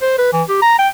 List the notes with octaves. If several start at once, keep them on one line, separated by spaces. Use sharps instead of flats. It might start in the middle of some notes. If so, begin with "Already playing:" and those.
C5
B4
E3
G4
A#5
G5